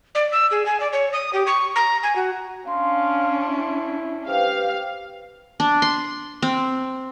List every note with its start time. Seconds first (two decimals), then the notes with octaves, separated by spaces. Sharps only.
0.15 D5
0.32 E6
0.51 G#4
0.66 G#5
0.80 D5
0.93 C#5
1.13 D#6
1.33 G4
1.47 C#6
1.76 A#5
2.03 G#5
2.16 F#4
2.67 C#4 D4 F5 C6
3.46 E4
4.28 G4 B4 C5 F5
5.60 D4
5.82 C6
6.42 C4